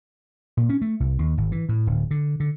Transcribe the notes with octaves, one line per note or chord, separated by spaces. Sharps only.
A#2
C#4
A3
C2
D#2
G#1
E3
A2
D1
D3
D3